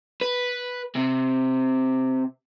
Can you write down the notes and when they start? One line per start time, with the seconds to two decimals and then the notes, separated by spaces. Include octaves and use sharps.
0.21 B4
0.95 C3